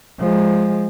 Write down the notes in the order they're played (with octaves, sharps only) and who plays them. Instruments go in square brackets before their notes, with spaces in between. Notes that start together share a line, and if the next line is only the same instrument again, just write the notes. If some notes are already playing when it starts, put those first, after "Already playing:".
[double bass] F3 G#3